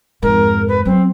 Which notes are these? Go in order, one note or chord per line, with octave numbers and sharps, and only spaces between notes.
F2 G#2 A#4
B4
F#3 C4